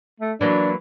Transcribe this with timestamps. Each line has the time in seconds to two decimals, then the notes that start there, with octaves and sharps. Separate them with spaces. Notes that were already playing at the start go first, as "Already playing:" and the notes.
0.20 A3
0.41 E3 F#3 A#3 D4